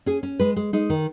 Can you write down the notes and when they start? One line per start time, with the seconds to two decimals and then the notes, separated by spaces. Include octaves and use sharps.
0.06 C#4 G#4
0.23 C#4
0.39 G#3 B4
0.56 G#3
0.73 G#3 D#4
0.90 D#3